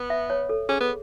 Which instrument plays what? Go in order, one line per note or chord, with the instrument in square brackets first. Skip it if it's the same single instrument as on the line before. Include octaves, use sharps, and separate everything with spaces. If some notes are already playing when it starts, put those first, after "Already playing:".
Already playing: [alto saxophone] B3
[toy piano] E5
C#5
A4
[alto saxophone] C#4 [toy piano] G#4
[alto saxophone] B3